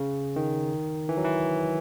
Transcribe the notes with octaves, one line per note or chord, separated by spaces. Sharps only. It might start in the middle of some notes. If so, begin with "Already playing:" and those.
Already playing: C#3
D#3
E3
F#3
E3